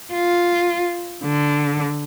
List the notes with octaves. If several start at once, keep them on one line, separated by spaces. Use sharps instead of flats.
F4
D3